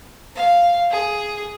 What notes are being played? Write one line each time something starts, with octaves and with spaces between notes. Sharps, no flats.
F5
G#4